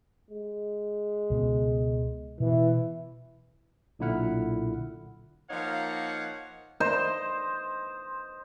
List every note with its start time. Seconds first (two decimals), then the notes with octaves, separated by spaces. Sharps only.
0.31 G#3
1.30 C#2 B2 B3
2.40 B2 E3
3.99 B1 A#2 D3 E4 F#5 F6
5.50 F3 A#3 D#4 C#5 F5 F#5
6.80 C5 D#5